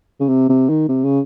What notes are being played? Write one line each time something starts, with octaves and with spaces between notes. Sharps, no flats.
C#3
C3
C3
D#3
C3
C#3